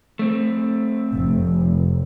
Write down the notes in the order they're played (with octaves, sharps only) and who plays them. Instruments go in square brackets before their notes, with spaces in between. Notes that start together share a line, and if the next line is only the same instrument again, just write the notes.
[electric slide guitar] A3 C4
[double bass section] F1